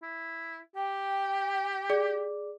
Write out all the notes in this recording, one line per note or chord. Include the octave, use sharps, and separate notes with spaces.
E4
G4 G5
G#4 D5 D6